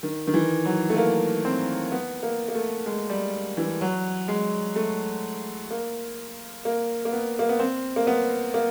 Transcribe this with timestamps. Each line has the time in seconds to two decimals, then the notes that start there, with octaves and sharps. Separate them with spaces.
0.03 D#3
0.27 D#3
0.34 E3
0.65 F#3
0.90 A3
0.97 A#3
1.45 C4
1.92 B3
2.23 A#3
2.48 A#3
2.55 A3
2.86 G#3
3.10 G3
3.57 E3
3.81 F#3
4.28 G#3
4.76 A3
5.71 A#3
6.65 A#3
7.05 A#3
7.12 B3
7.39 A#3
7.49 B3
7.59 C4
7.96 A#3
8.07 B3
8.54 A#3